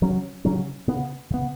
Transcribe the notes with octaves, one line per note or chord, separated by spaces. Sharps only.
C#3 F#3 C#4
C#3 F#3 C#4
C#3 B3
C#3 B3